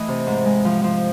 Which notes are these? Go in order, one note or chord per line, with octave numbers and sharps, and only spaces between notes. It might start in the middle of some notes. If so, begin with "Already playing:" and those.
Already playing: E3 A3 D#5
C3
G#2
G#3
F3
F3